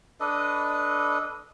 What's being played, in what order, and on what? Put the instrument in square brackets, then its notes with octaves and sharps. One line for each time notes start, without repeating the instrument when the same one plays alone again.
[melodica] D4 A4 B4 D#5